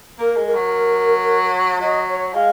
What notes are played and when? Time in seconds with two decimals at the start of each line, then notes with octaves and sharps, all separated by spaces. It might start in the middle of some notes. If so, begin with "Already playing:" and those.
0.18 A#3 A#4
0.36 G#3
0.45 A#4
0.54 F#3
1.80 F#3 D#5
2.08 C#5
2.33 G#3 F5